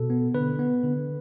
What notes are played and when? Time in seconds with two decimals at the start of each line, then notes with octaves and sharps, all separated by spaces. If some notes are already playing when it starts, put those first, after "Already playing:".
Already playing: B2 A4
0.10 B3
0.35 D3 B4
0.59 B3
0.84 D3